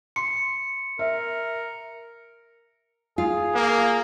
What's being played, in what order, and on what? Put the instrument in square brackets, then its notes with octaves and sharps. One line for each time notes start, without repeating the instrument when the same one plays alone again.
[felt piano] C6 [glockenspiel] C#7
[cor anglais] A#4 [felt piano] E5
[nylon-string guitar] F4 [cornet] G#4
[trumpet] A#3